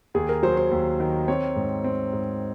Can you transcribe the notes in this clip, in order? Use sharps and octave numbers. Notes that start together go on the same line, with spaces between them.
D#2 G#4
A#4
F#3 C5
C5
D#2
D#3
C4 C#5
G#2
C4
G#2